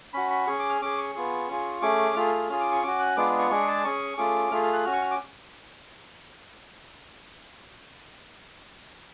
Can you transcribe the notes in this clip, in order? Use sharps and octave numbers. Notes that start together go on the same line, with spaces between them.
C#4 F#4 B5
B5
C#4 G#4 C#6
D6
F6
C#4 G#4 D6
C#6
B3 F4 G#4
C#4 F4 G#4
A3 C#4 G#4 D6
A3 F4 G#4 F6
F6
C#4 F4 G#4 F6
D6
C#6
C#4 F#4 D6
F#6
G#3 B3 D4 F4 G#4 D6
C#6
G#3 D4 G#4 C#6
A5
C#4 G#4 C#6
A3 C#4 F4 G#4 D6
A3 F4 G#4 F6
F6
F#6
C#4 F#4 F6
C#6
F6
D6